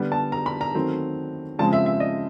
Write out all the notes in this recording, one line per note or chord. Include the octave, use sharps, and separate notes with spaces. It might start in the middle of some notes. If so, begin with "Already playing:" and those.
Already playing: D3 G3 B3
A5
A#5
B5
A#5
D#3 F#3 A3 C4
C#3 F3 G#3 C4 A5
E5
E5
D#5